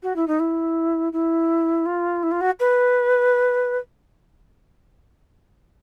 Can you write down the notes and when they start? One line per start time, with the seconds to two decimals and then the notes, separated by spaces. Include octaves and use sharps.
0.03 F#4
0.16 E4
0.27 D#4
0.39 E4
1.13 E4
1.86 F4
2.23 E4
2.31 F4
2.41 F#4
2.60 B4